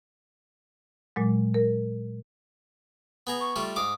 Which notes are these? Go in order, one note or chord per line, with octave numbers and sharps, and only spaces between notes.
A#2 F#3 G#3
A#4
B3 G#4 A#5
C#6
G3 A3 F4
G#2 F5 D6 D#6